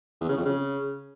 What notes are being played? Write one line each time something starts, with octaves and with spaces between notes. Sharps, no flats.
E2
C#3
F2
C#3